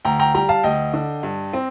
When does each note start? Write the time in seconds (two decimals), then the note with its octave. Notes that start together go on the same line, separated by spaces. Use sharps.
0.05 D2 G5 A#5
0.20 G5 A#5
0.35 G3 G5 A#5
0.49 F5 A5
0.63 D2 D#5 G5
0.94 D3
1.23 G2
1.53 C4